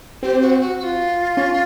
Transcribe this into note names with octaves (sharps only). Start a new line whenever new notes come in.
C4 G4
F#4
F#4
F#4
F4
C#4